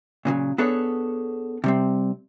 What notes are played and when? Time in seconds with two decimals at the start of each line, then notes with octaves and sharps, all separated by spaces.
0.25 A#2 C#3 E3 F#3
0.58 B3 D4 G#4 A4 B4 C#5
1.64 C3 G3 C4